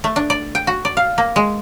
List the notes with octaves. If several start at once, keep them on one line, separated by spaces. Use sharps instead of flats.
A3
D4
D5
G5
F#4
D5
F5
A#3
G#3